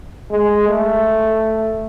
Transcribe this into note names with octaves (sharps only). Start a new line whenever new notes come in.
G#3
A3